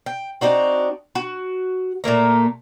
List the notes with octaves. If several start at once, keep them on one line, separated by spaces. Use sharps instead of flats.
G5
C4 D4 D#4 F#4
F#4
A#2 A3 A#3 A#5